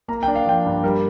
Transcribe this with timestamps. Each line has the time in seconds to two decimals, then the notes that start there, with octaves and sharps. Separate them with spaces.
0.08 A#3 A#5
0.23 D4 G5
0.36 F5
0.46 F3 G5
0.65 G2
0.83 G3 A#4